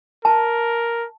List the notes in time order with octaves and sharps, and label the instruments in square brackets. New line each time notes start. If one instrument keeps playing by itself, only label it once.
[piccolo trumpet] A#4 [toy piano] A5